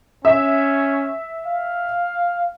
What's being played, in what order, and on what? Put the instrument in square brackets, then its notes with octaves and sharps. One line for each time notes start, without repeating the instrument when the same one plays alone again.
[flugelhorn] C#4 [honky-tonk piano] E5
[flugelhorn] F5